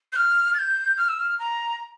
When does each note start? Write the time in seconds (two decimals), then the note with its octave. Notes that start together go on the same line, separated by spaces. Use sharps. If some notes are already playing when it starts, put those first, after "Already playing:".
0.13 G6
0.16 F6
0.54 A6
0.59 G6
0.98 F6
1.09 E6
1.19 F6
1.39 A#5